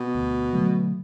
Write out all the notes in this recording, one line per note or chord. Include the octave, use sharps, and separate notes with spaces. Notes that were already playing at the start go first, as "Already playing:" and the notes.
Already playing: B2
D2
D3 F#3 A3